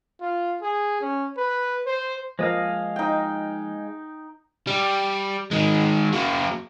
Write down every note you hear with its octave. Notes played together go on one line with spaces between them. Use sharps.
F4
G#4
C#4
B4
C5
F3 G#3 A#3 C5 D#5 F5
D#4 G5
G3
D#3 G#3
F#3 A#3